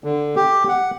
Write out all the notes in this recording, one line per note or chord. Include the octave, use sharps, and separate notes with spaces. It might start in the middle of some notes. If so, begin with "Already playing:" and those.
D3
G4
F#5